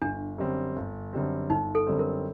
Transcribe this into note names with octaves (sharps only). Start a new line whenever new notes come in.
G1 D4
F#2 D3 G3 C4
G1
F#2 D3 G3 C4
G1 D#4
A4
F#2 D3 G3 C4
A#4